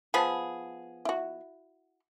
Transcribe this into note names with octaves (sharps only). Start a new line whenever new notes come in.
F3 B3 G#4 B4 A5
E4 F#4